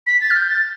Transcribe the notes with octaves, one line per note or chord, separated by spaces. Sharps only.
B6
A6
F6
G6
A6